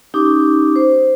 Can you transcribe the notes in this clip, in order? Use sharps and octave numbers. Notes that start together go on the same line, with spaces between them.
C#4 D#4 G4 D6
C5